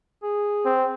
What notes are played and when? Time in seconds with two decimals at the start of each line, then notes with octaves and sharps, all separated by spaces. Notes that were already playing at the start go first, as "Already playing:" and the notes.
0.23 G#4
0.65 C4